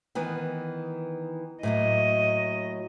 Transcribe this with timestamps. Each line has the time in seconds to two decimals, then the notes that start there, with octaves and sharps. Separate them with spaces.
0.15 D#3 E3 B3
1.63 A2 F#3 A#3 D#5